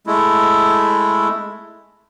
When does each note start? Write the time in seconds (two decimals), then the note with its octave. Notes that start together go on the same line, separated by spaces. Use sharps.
0.07 G#3 A3 E4